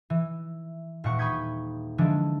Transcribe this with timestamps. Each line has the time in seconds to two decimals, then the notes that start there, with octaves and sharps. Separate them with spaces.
0.10 E3
1.04 D#1 A#2 A#4 F#5 C#6
1.18 B5 C#6 D#6 G6 G#6 B6
1.98 D3 E3 F3 G#3 D4